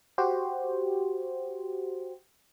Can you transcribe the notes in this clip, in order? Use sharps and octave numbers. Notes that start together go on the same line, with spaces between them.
F#4 G4 C5